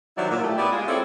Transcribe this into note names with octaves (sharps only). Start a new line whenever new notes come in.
D#3 F#3 G3 E4 C5 D5
A#2 E4
A3 G4
B3 E4 G4 D5
G#3 F4 G#4
G#3 C4 E4 A4 C#5 D5